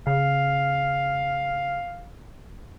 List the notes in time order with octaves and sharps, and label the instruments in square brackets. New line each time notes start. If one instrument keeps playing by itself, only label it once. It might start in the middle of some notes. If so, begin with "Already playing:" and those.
[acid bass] C#3 [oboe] F5